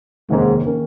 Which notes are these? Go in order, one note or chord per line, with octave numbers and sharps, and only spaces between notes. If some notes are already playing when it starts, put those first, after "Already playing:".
F1 D#2 G#2 D#3 A#3 C#4
D#3 A#3 C#4